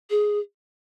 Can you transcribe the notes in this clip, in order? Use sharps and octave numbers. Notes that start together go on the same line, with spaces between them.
G#4